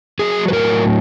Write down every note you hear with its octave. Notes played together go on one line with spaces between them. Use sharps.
F#3 G#4
B4
A2 A#4